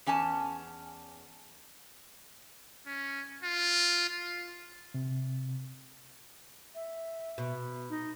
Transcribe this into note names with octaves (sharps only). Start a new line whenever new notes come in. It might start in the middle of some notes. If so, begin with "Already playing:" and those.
E2 C#4 G#5 A5
C#4
F4
F4
C3
E5
B2
D#4